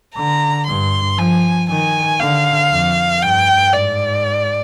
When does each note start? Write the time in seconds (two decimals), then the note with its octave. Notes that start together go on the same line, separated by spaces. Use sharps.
0.16 D3 A#5
0.67 G2 C6
1.18 F3 G#5
1.69 D#3 G#5
2.20 D3 F5
2.71 F2
3.22 G2 G5
3.72 G#2 D5